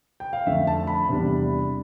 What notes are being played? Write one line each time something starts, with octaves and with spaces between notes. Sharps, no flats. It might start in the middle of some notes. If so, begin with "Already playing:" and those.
G5
F5
F2 D3 A3 D4 E5
A5
B5
E2 C3 G3 D4